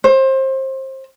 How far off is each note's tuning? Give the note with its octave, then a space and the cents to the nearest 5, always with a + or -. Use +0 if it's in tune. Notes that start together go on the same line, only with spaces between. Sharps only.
C5 +25